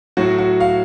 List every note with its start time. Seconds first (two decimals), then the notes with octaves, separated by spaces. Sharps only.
0.17 A2 F#3 F#4
0.38 F#4
0.60 F5